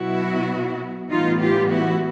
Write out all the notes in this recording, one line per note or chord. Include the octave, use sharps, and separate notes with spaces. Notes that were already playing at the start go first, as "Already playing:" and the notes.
Already playing: B2 F#3 B3 E4 F#4
A2 E3 G3 B3 D#4 F4
F4 G4
E4 F#4